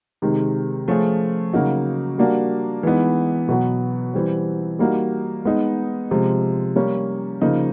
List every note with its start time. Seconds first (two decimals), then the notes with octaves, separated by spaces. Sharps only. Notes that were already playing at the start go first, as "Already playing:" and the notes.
0.22 C3 D#3 G#3
0.88 F3 A3 C#4 F4 G#4
1.53 C#3 F#3 A#3 D#4 F#4
2.18 G3 A#3 D4 F#4
2.83 E3 G#3 B3 D#4
3.49 B2 F#3 B3
4.14 E3 G3 C4
4.79 G3 A#3 D#4 F#4
5.45 G#3 B3 D#4 G#4
6.11 C3 F3 G#3
6.76 G3 A#3 C#4
7.41 C#3 F3 A#3 D#4